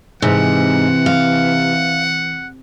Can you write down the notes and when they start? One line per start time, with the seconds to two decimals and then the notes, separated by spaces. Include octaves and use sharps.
0.22 G#2 C3 E3 F#5
1.06 F5